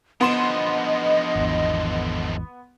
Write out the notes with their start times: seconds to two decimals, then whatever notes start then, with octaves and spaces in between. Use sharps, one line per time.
0.21 D3 F3 B3 D#5 C6 E7
1.35 G#1 E2